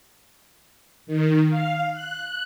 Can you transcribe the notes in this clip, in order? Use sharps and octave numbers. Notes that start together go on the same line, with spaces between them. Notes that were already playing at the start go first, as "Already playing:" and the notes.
D#3
F5
F#6